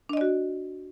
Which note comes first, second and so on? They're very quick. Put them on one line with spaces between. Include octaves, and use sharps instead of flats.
D4 D#5 D5 F#4